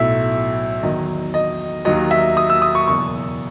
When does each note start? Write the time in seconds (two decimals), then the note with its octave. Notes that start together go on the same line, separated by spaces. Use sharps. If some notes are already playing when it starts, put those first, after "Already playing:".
Already playing: B1 A2 F#3 E5
0.83 E2 D#3 F#3 D#5
1.34 D#5
1.85 D#2 D#3 F#3 D#5
2.11 E5
2.37 D#6
2.50 E6
2.62 D#6
2.75 C#6
2.87 F#1 E2 B2 C#6